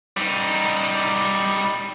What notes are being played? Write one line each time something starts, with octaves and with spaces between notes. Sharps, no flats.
G3 D#4